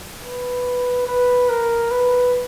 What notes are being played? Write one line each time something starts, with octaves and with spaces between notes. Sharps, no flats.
B4
B4
A#4
B4